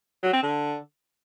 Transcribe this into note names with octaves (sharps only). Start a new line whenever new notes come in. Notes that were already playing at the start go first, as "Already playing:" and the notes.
F#3
C4
D3